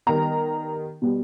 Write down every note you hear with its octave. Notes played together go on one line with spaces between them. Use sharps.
D#3 G3 B3 A#5
B2 G3 B3